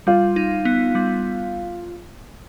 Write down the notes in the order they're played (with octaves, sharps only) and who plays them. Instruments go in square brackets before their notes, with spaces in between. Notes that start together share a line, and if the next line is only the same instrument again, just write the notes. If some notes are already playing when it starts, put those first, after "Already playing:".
[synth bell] G3 [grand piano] F4
[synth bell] D#4
B3
G3